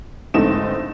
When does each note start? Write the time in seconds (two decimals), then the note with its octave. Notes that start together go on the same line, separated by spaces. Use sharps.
0.34 G1 G#2 A3 C4 D#4 E7